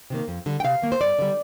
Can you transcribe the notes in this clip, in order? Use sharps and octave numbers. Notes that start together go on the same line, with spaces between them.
C3 D#3 A#3
F2
D3 G3
G5
C3 F5
D#3 A#3
C5
G2 D5
D3 G3